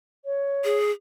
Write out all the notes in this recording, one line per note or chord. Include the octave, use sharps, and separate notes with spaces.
C#5
G#4